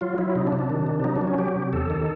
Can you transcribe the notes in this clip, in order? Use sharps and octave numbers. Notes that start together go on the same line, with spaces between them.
F#3 F4
F#3 E4
C3 D#4
D4
C3
D4
D#3
C3
D4
F#3 D#4
D4
F#3
C#4
F#3 G4
C3
E2 A4
D#3